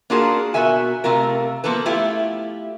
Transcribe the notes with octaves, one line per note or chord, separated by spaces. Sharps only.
A#3 D4 F4 F#4 G#4 A#4
B2 F#4 A#4 E5 G#5
C3 A3 F4 A#4
F3 A#3 B3 A4 B4
A3 E4 F4 G4